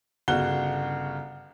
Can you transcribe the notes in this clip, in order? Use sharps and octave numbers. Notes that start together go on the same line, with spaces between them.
G1 C#3 F#4 F#5 G7